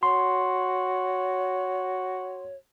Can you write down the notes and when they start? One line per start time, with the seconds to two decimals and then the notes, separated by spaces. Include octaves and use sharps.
0.03 F#4 C#5 C6